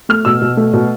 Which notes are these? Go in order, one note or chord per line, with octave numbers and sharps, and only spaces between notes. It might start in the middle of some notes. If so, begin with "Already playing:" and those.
A3 F6
B2 E6
B2
A3
B2